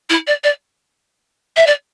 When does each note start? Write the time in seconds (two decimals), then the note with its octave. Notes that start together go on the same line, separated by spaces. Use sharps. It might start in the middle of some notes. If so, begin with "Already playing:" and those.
0.09 E4
0.27 D5
0.44 D5
1.57 E5
1.66 D5